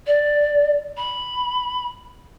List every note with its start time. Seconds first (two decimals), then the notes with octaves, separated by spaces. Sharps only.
0.06 D5
0.97 B5